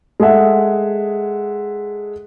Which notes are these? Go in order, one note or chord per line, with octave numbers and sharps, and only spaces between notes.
G#3 G#4 A4 E5 F#5